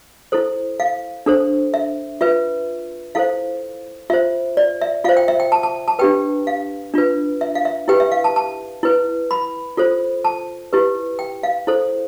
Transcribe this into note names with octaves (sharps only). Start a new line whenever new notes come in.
E4 A4 C5
F5
D4 A4 C5
E5
F4 B4 E5
E4 A4 C5 F5
F4 C5 E5
D5
E5
F4 C5 F5
G5
E5
G5
A5
A5
A5
D4 G4 B4 G5
F5
D4 F4 B4
E5
F5
E5
E4 G4 B4 G5
E5
F5
A5
A5
E4 B4
B5
F4 A4 C5
A5
E4 G4 B4
G5
F5
E4 A4 C5